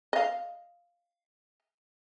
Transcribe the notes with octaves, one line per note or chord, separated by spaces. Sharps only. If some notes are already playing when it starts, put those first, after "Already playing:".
D#5 F5